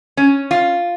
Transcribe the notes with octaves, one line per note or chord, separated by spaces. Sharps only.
C#4
F4